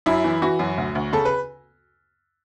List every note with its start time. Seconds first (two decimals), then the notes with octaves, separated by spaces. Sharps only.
0.06 F#2 E4
0.24 E3
0.42 E3 F#4
0.59 F#2
0.78 D2
0.95 D2
1.13 C#3 A4
1.25 B4